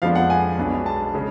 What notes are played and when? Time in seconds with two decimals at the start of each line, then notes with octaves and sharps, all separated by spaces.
0.02 F2 F3 G#3 B3 D4 F5
0.15 F#5
0.30 G#5
0.57 B1 B2 G#3 B3 D4
0.86 A5
1.14 C#3 G#3